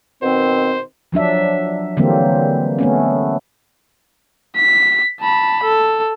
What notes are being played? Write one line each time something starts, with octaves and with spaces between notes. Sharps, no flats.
B2 D#3 C4 C5
F3 F#3 D4 E5
D3 E3 F#3 G3 A#3 C4
A3 B3 C#4
B6
A5 B5
A4